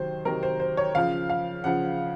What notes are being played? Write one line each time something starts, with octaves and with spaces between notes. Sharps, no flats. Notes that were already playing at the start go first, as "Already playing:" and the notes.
Already playing: C3 D#3 F#3 C5
C3 D#3 F#3 A#4
C5
C5
C#5
C#3 F3 F5
F5
C#3 F3 F#5